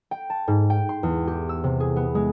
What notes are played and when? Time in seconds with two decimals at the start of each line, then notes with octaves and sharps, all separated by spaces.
0.11 G5
0.30 A5
0.48 G#2
0.70 G5
0.89 C6
1.03 E2
1.28 G4
1.49 E6
1.64 C3
1.80 G#4
1.96 B3
2.15 G#3